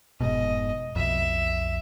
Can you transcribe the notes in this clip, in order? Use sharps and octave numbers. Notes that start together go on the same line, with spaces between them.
F1 G#2 B2 D#5
B1 F2 E5